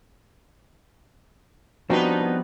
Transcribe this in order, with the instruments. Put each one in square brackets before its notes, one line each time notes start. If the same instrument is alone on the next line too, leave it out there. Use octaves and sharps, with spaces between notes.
[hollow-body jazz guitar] F3 G3 C4 [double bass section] B3 [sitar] D4 D#4 B4 [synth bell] F#4